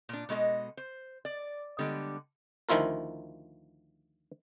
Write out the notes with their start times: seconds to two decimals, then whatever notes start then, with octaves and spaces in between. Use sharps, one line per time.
0.09 A#2 D4
0.29 B2 G#3 A4 D#5
0.77 C5
1.25 D5
1.79 D3 G3 G#3 B3
2.69 D2 D#3 F3 E4 F4 A#4